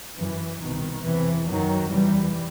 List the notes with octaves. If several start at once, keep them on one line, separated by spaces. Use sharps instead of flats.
F#2 E3
C2 B2 D#3
E2 C3 E3
F#2 D#3 F#3
E2 C3 E3 G3